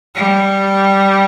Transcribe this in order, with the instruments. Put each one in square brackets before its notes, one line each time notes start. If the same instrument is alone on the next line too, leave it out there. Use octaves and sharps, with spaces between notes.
[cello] G3